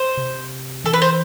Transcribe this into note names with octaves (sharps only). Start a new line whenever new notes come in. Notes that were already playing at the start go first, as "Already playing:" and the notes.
Already playing: C5
C3
E3 A4
B4
C5